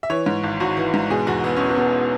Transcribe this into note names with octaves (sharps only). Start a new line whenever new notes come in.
E5
E3 C#5
G#2
G#1
G#1 F#4
E3
G#2
B2 G#4
E2 F#4
E1 B3
E1 C#4
B3
B2